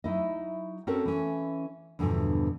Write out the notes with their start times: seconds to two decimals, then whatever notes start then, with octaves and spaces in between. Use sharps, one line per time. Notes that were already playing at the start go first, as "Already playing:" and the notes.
0.04 F#3 D#4 E4 D#5
0.87 C4 C#4 F#4 A4 A#4 C#5
1.05 E3 C#4
1.99 E2 G2 B2 D3 E3 F3